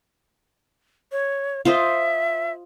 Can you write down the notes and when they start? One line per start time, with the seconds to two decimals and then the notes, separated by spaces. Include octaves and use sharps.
1.12 C#5
1.65 F4 C5 D#5 E5